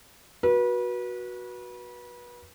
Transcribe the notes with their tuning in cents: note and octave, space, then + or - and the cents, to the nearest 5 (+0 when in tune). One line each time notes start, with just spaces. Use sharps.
F#4 -5 B4 -30